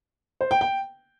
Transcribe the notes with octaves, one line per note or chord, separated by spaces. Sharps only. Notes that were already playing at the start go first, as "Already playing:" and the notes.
C5
G5
G5